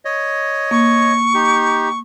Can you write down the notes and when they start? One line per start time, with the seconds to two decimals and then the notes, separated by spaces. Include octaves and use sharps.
0.05 C#5 D#5
0.71 A#3 C#6
1.34 D#4 G4